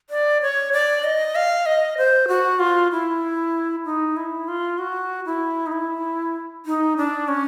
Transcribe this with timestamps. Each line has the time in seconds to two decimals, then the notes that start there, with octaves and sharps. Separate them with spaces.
0.10 D5
0.42 C#5
0.73 D5
1.04 D#5
1.35 F5
1.66 D#5
1.98 C5
2.28 F#4
2.59 F4
2.92 E4
3.85 D#4
4.17 E4
4.48 F4
4.78 F#4
5.26 E4
5.67 D#4
5.72 E4
6.66 D#4
6.97 D4
7.28 C#4